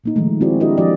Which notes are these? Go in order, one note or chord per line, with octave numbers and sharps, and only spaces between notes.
A#2 A#3 D#4
D#3 F3 G#3 A3
C4 E4 F#4 G#4 C5 D5
D4 E4 F#4 G4 A#4 D#5
F3 F#3 D4 F#4 D5 D#5